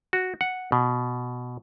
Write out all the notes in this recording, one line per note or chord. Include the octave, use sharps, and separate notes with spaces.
F#4
F#5
B2